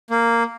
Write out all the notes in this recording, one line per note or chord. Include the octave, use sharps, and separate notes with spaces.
A#3